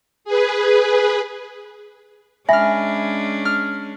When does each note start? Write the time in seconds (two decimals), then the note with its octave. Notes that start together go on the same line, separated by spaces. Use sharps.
0.25 G#4 B4
2.49 G#3 C#4 D4 E5 G#5 B5 F6 A#6
3.45 F6